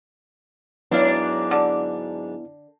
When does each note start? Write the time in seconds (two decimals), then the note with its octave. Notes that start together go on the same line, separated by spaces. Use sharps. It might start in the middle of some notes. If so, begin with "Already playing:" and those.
0.91 G#2 F#3 B3 D4 E4 F5
1.51 D3